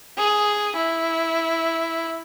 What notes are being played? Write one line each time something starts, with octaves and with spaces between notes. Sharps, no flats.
G#4
E4